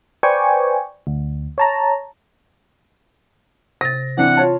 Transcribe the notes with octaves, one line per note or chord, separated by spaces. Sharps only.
B4 C5 D5 G5 G#5 C#6
D2
C#5 A5 A#5
C3 A6 A#6
E3 C4 D4 F#5
F4 C#5 A5